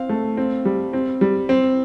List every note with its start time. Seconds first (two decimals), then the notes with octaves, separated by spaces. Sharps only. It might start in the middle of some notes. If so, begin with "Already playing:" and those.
Already playing: C4 F5
0.09 A3
0.37 C4
0.65 G3
0.93 C4
1.21 G3
1.49 C4